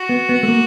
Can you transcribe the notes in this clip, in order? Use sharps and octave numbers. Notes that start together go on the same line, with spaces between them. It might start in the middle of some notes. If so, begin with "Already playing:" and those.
Already playing: F#4
B3
B3
A3
A#3